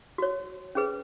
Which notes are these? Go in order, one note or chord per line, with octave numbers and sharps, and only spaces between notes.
F#4 C#5
C#4 G#4 B4